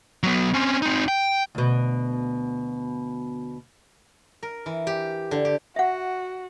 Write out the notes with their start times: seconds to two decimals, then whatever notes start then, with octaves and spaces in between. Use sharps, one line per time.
0.23 F#3 B3
0.54 C4 C#4
0.82 C4 D#4
1.08 G5
1.55 D2 B2
4.43 A#4
4.66 E3
4.87 G4
5.31 D3
5.45 G4
5.76 F#4 E5 F#5